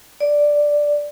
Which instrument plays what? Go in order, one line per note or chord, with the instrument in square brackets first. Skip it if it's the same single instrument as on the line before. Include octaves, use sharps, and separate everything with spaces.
[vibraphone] D5